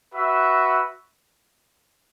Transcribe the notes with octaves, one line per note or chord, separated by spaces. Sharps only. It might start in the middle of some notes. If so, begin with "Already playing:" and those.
F#4 B4 E5